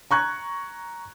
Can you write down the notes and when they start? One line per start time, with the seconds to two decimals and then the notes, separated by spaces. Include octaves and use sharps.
0.11 A#5 C#6 F#6 G#6